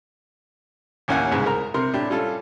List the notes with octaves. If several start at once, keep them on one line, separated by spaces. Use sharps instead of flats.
A1 D#2 A#3 C#4 F#5 G#5
C2 G#2 C#3 B4
A#4 A#5
C3 A#4 C6
A2 D4 G4
G3 C#4 F4 A4